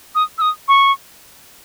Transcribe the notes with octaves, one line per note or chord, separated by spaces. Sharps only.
D#6
E6
D#6
C#6